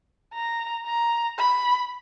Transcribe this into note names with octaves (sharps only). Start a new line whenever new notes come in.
A#5
A#5
B5